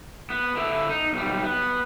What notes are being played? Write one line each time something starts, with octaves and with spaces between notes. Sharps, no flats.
B3
D3 E4
D#4
B1 G3
B3